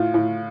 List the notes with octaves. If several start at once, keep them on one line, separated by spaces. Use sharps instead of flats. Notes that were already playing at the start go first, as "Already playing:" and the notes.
Already playing: A2 F4
A2